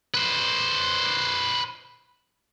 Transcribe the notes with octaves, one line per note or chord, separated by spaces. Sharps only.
B4 C5